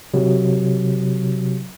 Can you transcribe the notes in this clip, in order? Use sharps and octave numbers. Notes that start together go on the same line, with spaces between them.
C3 F#3